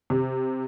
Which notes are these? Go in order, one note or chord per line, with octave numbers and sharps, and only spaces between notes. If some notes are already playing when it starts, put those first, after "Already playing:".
C3